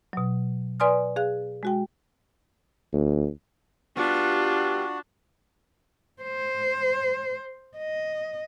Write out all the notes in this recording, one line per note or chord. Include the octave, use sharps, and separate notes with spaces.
B2 F#3
B4 D5 G#5 C6 D#6 F6
G#4 F5 F#6
G#3 F#4 G5
D2
G3 B3 D4 F4 F#4
C5
D#5